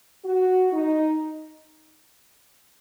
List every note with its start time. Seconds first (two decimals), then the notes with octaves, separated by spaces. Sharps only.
0.25 F#4
0.73 D#4